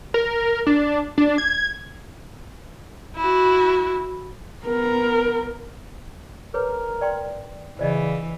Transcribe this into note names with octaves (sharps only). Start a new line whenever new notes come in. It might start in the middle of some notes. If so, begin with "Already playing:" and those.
A#4
D4
D4
G#6
E4 F#4
B3 A#4
G#4 A#4 B4 C#5
D5 G5 C6
C#3 E3 C5 D5 D#5